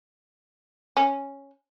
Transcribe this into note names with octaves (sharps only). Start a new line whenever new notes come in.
C#4